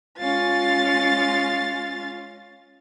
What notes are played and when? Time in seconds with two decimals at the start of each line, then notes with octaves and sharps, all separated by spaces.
0.19 G#3 C#4 F4 F5 A6